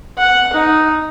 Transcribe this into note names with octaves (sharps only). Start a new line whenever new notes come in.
F#5
D#4